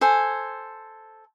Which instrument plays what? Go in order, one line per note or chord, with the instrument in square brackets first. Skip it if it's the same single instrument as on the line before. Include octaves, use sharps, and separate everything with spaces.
[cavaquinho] A4 C5 G#5